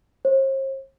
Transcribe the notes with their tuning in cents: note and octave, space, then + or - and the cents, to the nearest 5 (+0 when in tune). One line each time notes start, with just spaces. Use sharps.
C5 +45